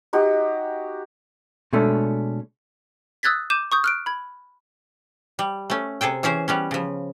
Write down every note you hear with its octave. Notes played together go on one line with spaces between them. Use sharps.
D#4 F#4 G4
B2 G#3 A3 C#4 D4 A4
D#6 E6 F#6 G#6 A6 B6
D6 G6 D#7 E7
C#6 D#6 G6
F6 F#6 D7
B5 G#6
G3
A3 C#4
C3 G#4 A4 G5
E3 C#4 G#4 C5
G3 B3 C#4
C#3 F3